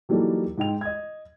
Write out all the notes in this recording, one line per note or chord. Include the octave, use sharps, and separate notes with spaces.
E3 F#3 G3 A#3 D#4 A4
G#2 D#4 G5 F7
D#5 G#6